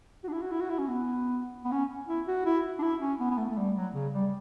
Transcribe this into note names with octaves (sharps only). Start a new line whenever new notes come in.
F#4
D4
E4
F#4
E4
F#4
E4
C#4
B3
B3
C#4
E4
F#4
E4
D4
E4
C#4
B3
B3
A3
A3
G3
F#3
C#3
G3